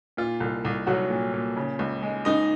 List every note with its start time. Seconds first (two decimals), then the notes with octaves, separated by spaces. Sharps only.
0.17 A#2 F4
0.40 C2
0.65 C2
0.87 C2 F#3 F#4
1.10 A#2
1.33 A#2
1.57 C#3
1.79 C#2
2.02 G#3
2.25 C#2 D#4 D#5